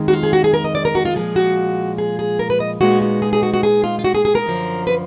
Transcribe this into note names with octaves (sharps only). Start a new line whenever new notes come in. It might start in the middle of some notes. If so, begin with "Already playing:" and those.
Already playing: F2 D#3 G#3
F#4
F4
G#4
F#4
G#4
A#4
D#5
D5
A#4
F#4
F4
A#2 F3 G#3 G#4
F#4
G#4
G#4
A#4
B4
D#5
A#2 G#3 B3 D#4 F#4
F#4
G#4
G#4
F#4
F#4
G#4
F4
F4
F#4
G#4
G#4
A#4
F#2 D3 F3
B4